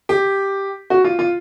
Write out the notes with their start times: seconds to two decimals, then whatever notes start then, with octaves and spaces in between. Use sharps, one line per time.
0.09 G4
0.90 F#4
1.04 F4
1.19 F4